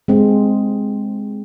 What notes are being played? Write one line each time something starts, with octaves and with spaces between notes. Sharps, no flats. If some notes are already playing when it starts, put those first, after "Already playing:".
G#3 C4